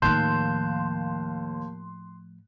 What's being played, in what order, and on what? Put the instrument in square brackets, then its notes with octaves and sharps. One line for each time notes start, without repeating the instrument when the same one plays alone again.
[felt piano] D#2 F#6 [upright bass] A2 F3 [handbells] A#3 A5 G6 [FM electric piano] C6